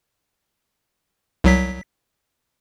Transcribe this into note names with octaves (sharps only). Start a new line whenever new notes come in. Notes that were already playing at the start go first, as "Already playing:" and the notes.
C2 F#3 B6